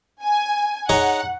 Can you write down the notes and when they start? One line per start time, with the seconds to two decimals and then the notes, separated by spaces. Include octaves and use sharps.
0.23 G#5
0.89 D#4 G#4 C#5 F#5